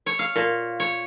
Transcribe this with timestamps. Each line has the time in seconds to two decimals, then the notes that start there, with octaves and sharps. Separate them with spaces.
0.06 C#5
0.19 F5
0.36 A#2
0.80 C#5